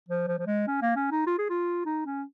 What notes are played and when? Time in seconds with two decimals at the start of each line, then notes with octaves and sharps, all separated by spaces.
0.08 F3
0.28 F3
0.39 F3
0.47 G#3
0.67 C#4
0.82 A#3
0.96 C#4
1.11 D#4
1.27 F4
1.38 G#4
1.49 F4
1.86 D#4
2.06 C#4